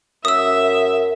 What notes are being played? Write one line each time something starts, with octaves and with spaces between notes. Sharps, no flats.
F#2 E5 D#6 E6